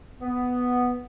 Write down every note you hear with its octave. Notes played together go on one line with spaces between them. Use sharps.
B3